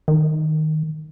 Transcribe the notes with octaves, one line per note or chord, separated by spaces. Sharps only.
D#3